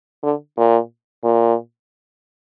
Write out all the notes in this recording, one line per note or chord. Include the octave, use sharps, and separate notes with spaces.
D3
A#2
A#2